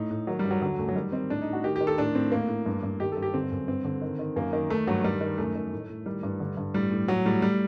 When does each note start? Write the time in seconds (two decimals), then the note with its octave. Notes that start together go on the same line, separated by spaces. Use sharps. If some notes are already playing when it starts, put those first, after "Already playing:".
Already playing: A2 D#4
0.11 A2
0.27 D#3 F#3
0.39 G3
0.44 G2
0.51 F#3
0.62 D3 F#3
0.78 F#2 A3
0.88 F#3
0.96 D#3 G3
1.12 D#3 C4
1.30 A2 D4
1.41 D#4
1.47 A2
1.53 F#4
1.64 D#3 G4
1.76 G4
1.81 D#3
1.87 A4
1.98 A2 D4
2.15 A2 C4
2.32 A2 A#3
2.49 A2
2.66 G2
2.83 G2
3.00 D#3 G4
3.12 A4
3.17 G2
3.22 G4
3.34 D3 C4
3.51 F#2
3.68 G2 C4
3.85 D3
4.02 D#3
4.19 D#3
4.36 F#2 A#3
4.53 D#3
4.70 D#3 A3
4.87 G2 F#3
5.04 D#3 G3
5.21 D#3
5.38 F#2 A3
5.55 D#3
5.72 A2
5.90 A2
6.06 D#3 G3
6.23 G2
6.40 D3
6.57 G2
6.74 A2 G3
6.92 A2
7.08 A2 F#3
7.25 A2 G3
7.42 A2 G3